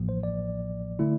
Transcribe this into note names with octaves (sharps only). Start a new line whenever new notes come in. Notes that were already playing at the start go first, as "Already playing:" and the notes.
Already playing: A1 A2 F3 A#3
C5
D5
D3 A3 E4